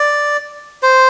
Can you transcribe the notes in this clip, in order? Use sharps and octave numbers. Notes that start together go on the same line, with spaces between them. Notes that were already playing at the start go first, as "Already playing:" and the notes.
Already playing: D5
C5